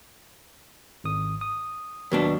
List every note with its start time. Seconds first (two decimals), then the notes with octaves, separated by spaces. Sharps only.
1.04 G#1 D#6
1.41 D#6
2.12 D#2 B2 F#3 D4